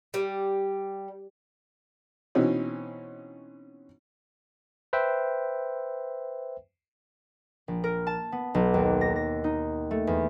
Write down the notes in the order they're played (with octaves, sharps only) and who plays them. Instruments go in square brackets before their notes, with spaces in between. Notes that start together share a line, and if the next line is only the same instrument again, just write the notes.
[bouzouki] G3
[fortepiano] B2 E3 C4 C#4 D#4
[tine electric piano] B4 C5 E5 G5
[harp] A#1
A#4
A5
B3
B1
D#2
A#6
A#6
D#4
A3
E2